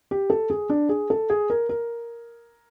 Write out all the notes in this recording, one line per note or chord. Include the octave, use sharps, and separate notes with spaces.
G4
A4
G#4
D4
G#4
A4
G#4
A#4
A#4